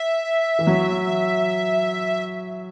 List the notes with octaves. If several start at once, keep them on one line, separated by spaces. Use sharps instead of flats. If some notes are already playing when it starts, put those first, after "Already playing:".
Already playing: E5
E3
F#3